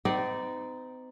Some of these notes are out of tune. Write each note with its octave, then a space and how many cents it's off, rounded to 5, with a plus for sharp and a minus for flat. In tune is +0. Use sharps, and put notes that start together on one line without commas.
C4 -40 D#4 +0 D5 +0